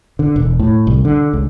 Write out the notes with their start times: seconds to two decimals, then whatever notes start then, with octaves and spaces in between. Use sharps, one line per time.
0.19 D3
0.36 E1
0.59 A2
0.87 C2
1.05 D3
1.33 C#2